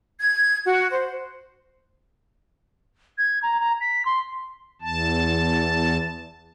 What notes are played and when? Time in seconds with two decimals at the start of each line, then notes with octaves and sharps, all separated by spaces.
0.20 G#6
0.65 F#4
0.92 C5
3.18 G#6
3.43 A#5
3.60 A#5
3.81 B6
4.05 C6
4.82 E2 A5